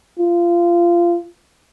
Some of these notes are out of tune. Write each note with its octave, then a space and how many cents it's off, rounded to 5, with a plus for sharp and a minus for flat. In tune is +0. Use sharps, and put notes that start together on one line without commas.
F4 -20